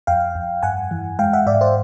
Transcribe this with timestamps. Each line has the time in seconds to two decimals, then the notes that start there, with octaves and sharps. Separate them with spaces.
0.07 F2 F5 G5
0.35 F2
0.63 G2 F#5 G#5
0.91 E3
1.19 G#3 F5 G5
1.33 E5 F#5
1.46 G#2 D5 E5
1.61 C5 D5